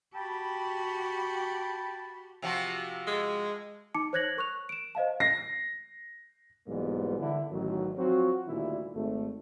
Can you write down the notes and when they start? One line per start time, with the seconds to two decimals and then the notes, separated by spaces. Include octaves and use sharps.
0.15 F#4 G4 G5 A5 B5
2.42 C3 F3 F#4
3.07 G#3
3.95 D#4 A5 D6 C#7
4.13 C5 C#5 F#6 G#6 A#6 F#7
4.37 A#4 C#6 F#6 F7
4.69 D7 E7
4.95 C5 D#5 F5 A5
5.20 A#6 C7
6.67 B1 G#2 E3 G3 A#3 B3
7.19 D3 E4
7.51 A1 D#3 F#3
7.96 F3 F#3 C4 F4 F#4
8.47 D2 A#2 D#3 G3 E4
8.94 G#1 A3